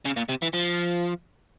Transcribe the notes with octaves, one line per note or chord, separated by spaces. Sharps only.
C#3
A#2
C3
E3
F3